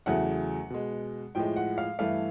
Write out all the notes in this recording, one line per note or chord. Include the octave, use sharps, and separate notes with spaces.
E2 C#3 F#3 A3 F#5
B2 G#3
A2 F3 G#3 G5
F#5
F5
G2 E3 A3 F5